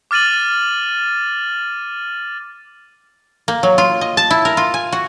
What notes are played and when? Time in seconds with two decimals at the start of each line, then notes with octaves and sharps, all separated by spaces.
0.11 D6 F6 A6 D#7 F#7
3.48 A#3
3.63 F#3
3.78 F4
4.01 D#5
4.17 A5
4.30 E4
4.45 A#4
4.57 F4
4.74 G#5
4.92 F#4